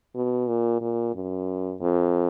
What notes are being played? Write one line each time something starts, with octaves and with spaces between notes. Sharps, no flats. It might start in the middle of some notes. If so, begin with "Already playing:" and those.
B2
A#2
A#2
F#2
F2